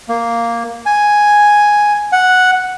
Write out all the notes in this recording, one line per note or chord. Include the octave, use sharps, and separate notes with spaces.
A#3
G#5
F#5